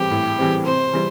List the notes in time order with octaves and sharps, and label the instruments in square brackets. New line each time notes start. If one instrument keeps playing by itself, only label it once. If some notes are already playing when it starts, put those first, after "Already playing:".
Already playing: [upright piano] A2 E3 G3 C4 [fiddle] G4
[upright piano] A2
E3 G3 C4
[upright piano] C3 [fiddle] C5
[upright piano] E3 G3